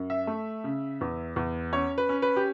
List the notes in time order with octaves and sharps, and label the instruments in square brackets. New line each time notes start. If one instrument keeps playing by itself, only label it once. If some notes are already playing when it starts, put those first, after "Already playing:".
Already playing: [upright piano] F#2
E5
A3
C#3
E2
E2
C#4 C#5
B4
C#4
B4
G4